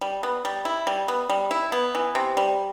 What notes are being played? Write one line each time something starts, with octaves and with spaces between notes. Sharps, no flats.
G3
B3
G3
E4
G3
B3
G3
E4
B3
E3
C3
G3